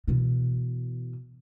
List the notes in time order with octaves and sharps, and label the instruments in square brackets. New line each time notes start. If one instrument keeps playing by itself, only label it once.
[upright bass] B2 E3